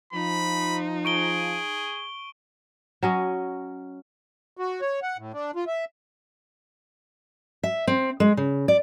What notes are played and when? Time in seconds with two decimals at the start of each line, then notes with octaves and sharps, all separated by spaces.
0.13 F3 D#4 B5
1.05 G#4 C#6 D7 G7
3.03 F#3 C#4 D#5
4.57 F#4
4.81 C#5
5.02 F#5
5.18 A2
5.34 D4
5.55 F4
5.67 E5
7.63 E5
7.87 C4
8.20 G#3
8.37 C#3
8.68 D5